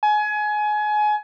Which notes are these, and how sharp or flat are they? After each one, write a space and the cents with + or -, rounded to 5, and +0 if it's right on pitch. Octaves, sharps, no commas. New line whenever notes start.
G#5 +25